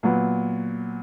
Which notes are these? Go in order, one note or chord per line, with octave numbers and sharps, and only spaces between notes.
A#2 F#3 B3